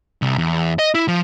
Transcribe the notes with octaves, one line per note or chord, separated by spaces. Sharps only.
C2
E2
D#5
E4
F3